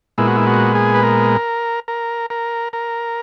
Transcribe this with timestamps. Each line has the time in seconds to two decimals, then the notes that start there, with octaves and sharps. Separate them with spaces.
0.18 A#2 G#3 B3 E4
0.27 F#4
0.36 E4
0.47 F#4
0.75 G#4
0.94 B4
1.03 A#4
1.88 A#4
2.30 A#4
2.73 A#4